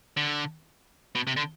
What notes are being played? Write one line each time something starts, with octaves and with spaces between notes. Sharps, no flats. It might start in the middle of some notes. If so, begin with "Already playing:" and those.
D3
B2
C3
D3